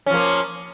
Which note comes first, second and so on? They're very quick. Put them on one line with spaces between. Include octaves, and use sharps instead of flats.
C#4 F3 A#3